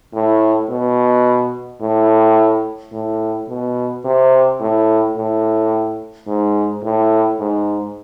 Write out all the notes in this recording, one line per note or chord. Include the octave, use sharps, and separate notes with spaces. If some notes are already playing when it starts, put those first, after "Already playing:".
A2
B2
A2
A2
B2
C3
A2
A2
G#2
A2
G#2